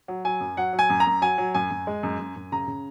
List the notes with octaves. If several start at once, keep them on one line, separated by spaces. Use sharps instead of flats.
F#3
F#3 G#5
F#2
F#3 F#5
F#3
G#5
F#2
A#5
F#2
F#3 G#5
F#3
F#2 G#5
F#2
G#3
F#2
F#2
F#2
C#3 A#5
C#3